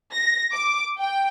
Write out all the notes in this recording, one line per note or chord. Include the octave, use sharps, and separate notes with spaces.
A#6
D6
G5